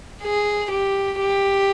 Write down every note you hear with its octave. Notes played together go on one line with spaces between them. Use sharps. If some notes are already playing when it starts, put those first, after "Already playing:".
G#4
G4
G4